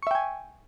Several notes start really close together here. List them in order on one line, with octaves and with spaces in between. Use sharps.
C#6 E5 G5 G#5